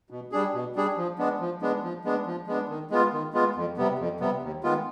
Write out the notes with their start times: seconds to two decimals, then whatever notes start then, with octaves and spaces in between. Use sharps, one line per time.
0.10 B2
0.32 G3 D4 G#4
0.54 B2
0.76 G3 D4 G#4
0.97 F3
1.19 G#3 B3 D4
1.40 F3
1.62 G#3 B3 D4
1.83 F3
2.05 G#3 B3 D4
2.26 F3
2.47 G#3 B3 D4
2.69 D#3
2.91 G#3 B3 F4
3.13 D#3
3.33 G#3 B3 F4
3.56 F2
3.77 C3 G3 B3
3.99 F2
4.20 C3 G3 B3
4.42 D#2
4.63 D#3 G#3 B3 F4